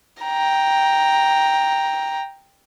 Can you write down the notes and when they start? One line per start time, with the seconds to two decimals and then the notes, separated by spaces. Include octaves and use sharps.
0.23 G5 A#5